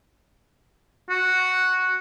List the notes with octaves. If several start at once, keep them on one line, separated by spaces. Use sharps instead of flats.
F#4